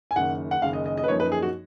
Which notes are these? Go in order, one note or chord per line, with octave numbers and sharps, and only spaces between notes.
G#5
F#1 F#2 D#3 F#5
F#5
F#1 F#2 D#3 F5
D#5
D#5
D#5
B4
F#2 F3 A#3 D#4 C#5
B4
G#4
F#4